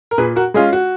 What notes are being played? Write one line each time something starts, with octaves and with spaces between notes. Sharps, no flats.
A#4
A#2 G#4 B4
F#4 A#4
G#3 C#4 F4 G#4
F#4